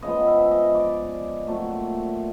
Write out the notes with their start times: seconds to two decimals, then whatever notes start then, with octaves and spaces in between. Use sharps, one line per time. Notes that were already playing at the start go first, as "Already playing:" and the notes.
0.02 C#3 F3 G#3 B3 D#5
0.27 E5
0.51 D#5
0.75 D5
1.47 A#2 F#3 A3 C4